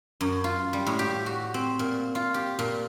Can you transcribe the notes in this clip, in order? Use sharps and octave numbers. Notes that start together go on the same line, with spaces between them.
F#2
F4
G3
A2
G4
F#4
C4
A#2
F4
G4
A#2